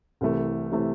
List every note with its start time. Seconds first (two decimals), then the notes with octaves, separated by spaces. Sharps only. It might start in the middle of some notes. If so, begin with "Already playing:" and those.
0.21 C2 C3 E3 A3
0.72 C3 E3 A3